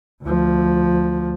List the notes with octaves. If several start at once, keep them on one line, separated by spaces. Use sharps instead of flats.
D2 F3